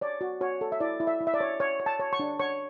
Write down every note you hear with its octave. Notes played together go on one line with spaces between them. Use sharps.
C#5 D5
F#4
F#4 C#5
A4
E5
E4 D5
E4
E5
E4
E5
D5
C#5
C#5
C#5
A5
C#5
C#6
D4
C#5 C#6